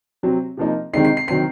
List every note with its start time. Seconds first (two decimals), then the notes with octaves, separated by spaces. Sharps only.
0.23 C3 F#3 C4
0.57 C3 F3 A#3 D#4
0.93 C3 D#3 G#3 C4 D#4 C7
1.05 C7
1.17 C7
1.27 D#3 F#3 C4 C7